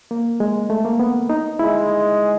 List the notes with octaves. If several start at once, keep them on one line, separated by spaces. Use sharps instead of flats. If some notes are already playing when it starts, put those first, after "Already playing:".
A#3
G#3
A3
A#3
B3
D#4
G#3 E4